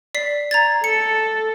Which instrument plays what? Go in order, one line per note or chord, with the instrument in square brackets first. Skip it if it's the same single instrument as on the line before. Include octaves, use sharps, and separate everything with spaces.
[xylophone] D5 B6 C7
A#5 G#6 A6
[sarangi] A4 [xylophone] C#7